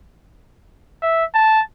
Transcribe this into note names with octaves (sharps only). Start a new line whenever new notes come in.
E5
A5